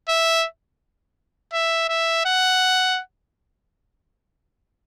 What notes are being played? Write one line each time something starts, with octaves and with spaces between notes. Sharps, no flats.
E5
E5
E5
F#5